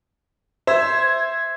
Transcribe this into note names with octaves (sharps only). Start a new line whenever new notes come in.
C5 E5 G#6